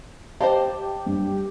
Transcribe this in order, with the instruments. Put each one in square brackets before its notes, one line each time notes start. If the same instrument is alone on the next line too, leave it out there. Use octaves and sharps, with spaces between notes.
[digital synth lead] G4 [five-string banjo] C5 D#5 F5 [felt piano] A5
[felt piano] G2